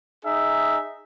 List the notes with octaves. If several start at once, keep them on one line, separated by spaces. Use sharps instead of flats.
D#4 G#4 E5